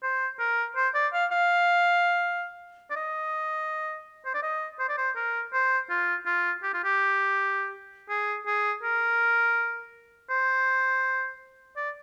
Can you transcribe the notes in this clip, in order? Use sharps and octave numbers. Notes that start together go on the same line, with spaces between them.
C5
A#4
C5
D5
F5
F5
D5
D#5
C5
D5
D#5
C5
D5
C5
A#4
C5
F4
F4
G4
F4
G4
G#4
G#4
A#4
C5
D5